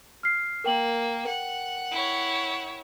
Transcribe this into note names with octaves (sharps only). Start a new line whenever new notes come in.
F6 C7
A#3 A#4 G5 F#7
F#5
E4 C#5